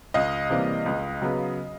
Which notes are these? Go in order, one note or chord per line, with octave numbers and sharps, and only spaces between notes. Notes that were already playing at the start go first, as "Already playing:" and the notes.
C#2 D#5 F5
C3 E3 G3 A#3
C#2
C#3 F#3 B3